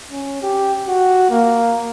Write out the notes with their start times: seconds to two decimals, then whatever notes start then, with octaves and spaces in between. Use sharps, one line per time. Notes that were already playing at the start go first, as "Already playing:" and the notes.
0.11 C#4
0.42 G4
0.88 F#4
1.30 A#3